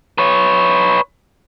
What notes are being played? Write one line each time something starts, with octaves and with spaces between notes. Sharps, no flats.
B4 C#5